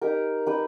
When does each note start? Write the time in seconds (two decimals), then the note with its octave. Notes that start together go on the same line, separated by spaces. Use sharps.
0.02 D#4 G4 A#4
0.47 D#4 G4 B4